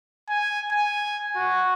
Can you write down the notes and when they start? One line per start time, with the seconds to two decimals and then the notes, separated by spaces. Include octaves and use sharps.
0.29 G#5
0.72 G#5
1.36 F#4